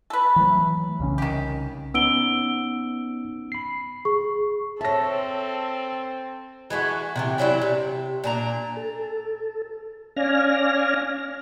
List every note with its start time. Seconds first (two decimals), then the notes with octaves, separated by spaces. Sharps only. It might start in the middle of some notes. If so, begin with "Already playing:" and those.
0.10 A4 B4
0.36 E3 F#3 A3
1.00 C2 C#3 C#4
1.18 D#3 G4
1.94 B3 C#4 D#4 E6 D7 G7
3.52 B5 C7
4.05 G#4 C#6
4.81 C4 A4 C#5 E5 A5 A#6
6.70 E3 G#3 A3 F#4
7.16 C3 D#3 E3
7.38 E3 F#3 D4 E4
7.61 C3
8.24 A#2 D4 A#5
8.77 A4
10.16 C#4 D5 F5 G#5 F6 A#6